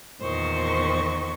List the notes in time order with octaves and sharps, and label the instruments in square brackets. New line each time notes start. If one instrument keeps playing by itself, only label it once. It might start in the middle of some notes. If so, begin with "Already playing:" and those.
[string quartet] E2 A#2 D#3 C5 C#6